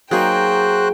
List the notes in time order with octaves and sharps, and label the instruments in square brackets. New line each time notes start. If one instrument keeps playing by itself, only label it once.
[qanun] F#3 A#3 D#4 [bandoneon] F#4 C5 F#6 [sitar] G#4 [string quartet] G5